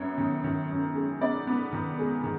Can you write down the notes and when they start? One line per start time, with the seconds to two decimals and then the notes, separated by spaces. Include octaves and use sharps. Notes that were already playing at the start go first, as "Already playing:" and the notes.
Already playing: F#2 B3 C#5
0.18 D#3
0.44 D#3
0.70 F#2
0.95 G#3
1.21 B3 D5
1.47 B3
1.72 D#3
1.99 G#3
2.24 D#3